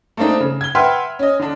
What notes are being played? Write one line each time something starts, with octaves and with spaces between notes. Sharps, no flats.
A3 A#3 C4 D4 D#4
C#3
G#6 G7
B4 E5 F#5 G5 C6 F6
C#4 D#5
D3 D4